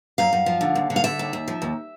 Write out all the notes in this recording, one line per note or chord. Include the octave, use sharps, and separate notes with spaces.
F#2 F5
F#2
F3
D3
D#2
D3
F5
D3 E5
D#2
D#2
F3
D#2